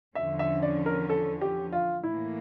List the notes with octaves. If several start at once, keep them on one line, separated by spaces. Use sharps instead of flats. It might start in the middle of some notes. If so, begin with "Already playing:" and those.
E2 D3 F3 C#4 E5
E5
D5
A#4
A4
G4
F4
A2 E3 A#3 E4